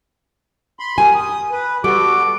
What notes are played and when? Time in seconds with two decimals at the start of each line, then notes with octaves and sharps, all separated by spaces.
0.79 B5 C6
0.98 G4 A#4 G#5
1.15 D#6
1.51 B4
1.84 G3 B3 F#4 A4 D6